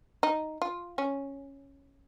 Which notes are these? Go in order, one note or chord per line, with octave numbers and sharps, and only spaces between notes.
D#4
F4
C#4